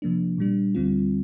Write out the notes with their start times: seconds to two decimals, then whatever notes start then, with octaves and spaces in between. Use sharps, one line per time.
0.02 C3 F3 A#3 D4
0.38 A#2 G3 D4
0.75 D2 D3 G3 C4 F4